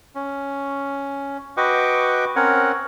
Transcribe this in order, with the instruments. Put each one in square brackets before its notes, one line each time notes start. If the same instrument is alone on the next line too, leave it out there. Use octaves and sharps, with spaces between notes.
[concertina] C#4
F#4 B4 D#5 G5 C#6 D6
C4 C#4 A#4 C#5 F#5